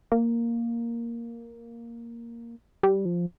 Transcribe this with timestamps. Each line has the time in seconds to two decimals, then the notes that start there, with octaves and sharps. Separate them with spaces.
0.12 A#3
2.83 G3
3.05 F3